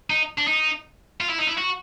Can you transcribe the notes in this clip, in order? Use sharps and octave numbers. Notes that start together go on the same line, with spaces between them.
D#4
D4
D#4
F4
E4
D#4
E4
F#4